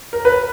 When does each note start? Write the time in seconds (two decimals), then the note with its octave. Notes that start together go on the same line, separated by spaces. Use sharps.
0.13 A#4
0.25 B4